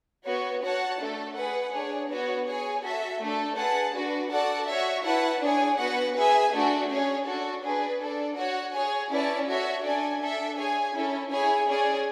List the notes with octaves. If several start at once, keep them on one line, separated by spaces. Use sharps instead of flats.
B3 F#4 C#5
F#4 C#5 F#5 A5
A3 D4 A4
G#4 B4 F#5
D4 G#4 C#5
B3 F#4 C#5
G#4 C#5 G#5
F#4 A4 E5
A3 D4 A4
G#4 B4 F#5 A5
D4 F#4 B4
F#4 A4 D5 F#5 A5
F#4 C#5 E5
E4 B4 F#5 A5
D4 G#4 C#5 G#5
B3 F#4 B4 F#5
G#4 B4 E5 G#5
A3 D4 F#4
C#4 G#4 C#5
D4 F#4 A4
D4 G#4 B4
D4 A4 D5
F#4 C#5 F#5
G#4 C#5 G#5
C#4 E4 B4 D5 A5
F#4 A4 C#5 E5
D4 A4 D5 G#5
D4 A4 E5
G#4 C#5 G#5
C#4 E4 A4
E4 G#4 C#5 G#5
C#4 G#4 D5